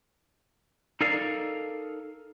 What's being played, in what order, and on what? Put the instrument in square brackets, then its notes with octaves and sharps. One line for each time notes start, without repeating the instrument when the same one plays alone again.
[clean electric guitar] D#4 A4 A#4 D5 F5